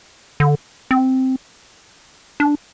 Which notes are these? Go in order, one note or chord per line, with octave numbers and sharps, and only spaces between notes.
D3
C4
D4